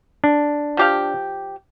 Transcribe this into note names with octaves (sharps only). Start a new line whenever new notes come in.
D4
F3 G4 F5